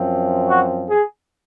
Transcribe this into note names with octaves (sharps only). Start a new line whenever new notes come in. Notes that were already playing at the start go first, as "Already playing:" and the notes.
Already playing: F#2 F3 C4
F#4
G#4